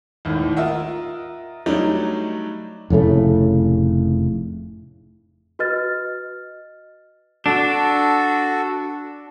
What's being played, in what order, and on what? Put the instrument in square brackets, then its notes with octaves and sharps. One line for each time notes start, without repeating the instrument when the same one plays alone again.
[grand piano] G#1 D#2 A2
F4 A#4 D#5 E5 F#5
F#3 G3 A3 D4 D#4
[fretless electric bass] F1 A2 C#3 A3
[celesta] F#4 B4 D#5 F6 A6
[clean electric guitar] D4 [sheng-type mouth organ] F#4 A4